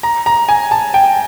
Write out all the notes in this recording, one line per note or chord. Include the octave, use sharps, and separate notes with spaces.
A#5
A#5
G#5
A5
G5